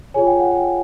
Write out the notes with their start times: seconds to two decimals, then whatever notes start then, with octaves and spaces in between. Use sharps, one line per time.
0.14 F4 G#4 C#5 G#5
0.27 G5
0.40 F#5
0.51 G5